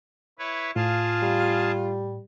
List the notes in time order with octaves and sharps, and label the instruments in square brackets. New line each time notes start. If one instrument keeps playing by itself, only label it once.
[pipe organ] E4 B4 C#5
[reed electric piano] A2 [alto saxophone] F4 [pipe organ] G#4 F5 A5
[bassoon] G3